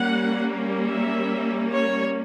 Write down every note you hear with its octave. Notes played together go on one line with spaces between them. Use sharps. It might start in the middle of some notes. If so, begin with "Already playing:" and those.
Already playing: G3 A#3 C#4 F#5
E5
C#5